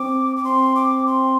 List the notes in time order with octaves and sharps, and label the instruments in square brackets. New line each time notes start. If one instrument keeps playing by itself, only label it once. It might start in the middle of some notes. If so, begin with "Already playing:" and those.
Already playing: [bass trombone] C4 [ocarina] D6
[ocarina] D6
[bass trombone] C4 [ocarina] C6
[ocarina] D6
C6